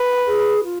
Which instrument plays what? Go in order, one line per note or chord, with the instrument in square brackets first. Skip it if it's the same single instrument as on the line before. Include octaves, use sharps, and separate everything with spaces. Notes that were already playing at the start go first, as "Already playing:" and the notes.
Already playing: [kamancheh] B4
[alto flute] G#4
F4